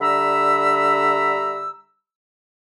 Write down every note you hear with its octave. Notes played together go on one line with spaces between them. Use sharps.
D3 G3 E5 A#5 B5 E6